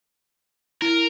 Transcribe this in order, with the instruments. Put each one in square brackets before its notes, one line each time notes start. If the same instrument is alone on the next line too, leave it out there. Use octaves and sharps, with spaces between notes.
[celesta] E4 [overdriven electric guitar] A#4